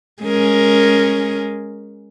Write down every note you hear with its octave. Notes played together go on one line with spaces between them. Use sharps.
G#3 C#4 A#4